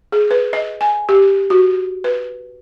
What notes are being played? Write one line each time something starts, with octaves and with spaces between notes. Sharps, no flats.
G#4
B4
D#5
G#5
G4
F#4
B4